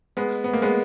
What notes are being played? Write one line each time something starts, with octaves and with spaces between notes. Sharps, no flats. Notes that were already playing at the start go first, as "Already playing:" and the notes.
G#3 B3
B3
A#3
G#3 B3